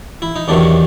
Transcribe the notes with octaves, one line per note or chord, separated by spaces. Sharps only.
E4
D#4
E2 C3 D#3 F#3 D4